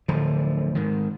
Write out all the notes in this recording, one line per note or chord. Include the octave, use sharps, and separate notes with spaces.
D1 D3 F3
G#2 D#3